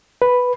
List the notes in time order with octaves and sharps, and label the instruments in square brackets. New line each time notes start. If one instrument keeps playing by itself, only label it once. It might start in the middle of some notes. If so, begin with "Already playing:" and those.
[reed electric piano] B4